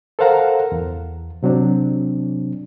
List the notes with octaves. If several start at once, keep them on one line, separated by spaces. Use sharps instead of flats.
A4 A#4 C5 F5 F#5 A#5
E2
C3 F#3 C4 D4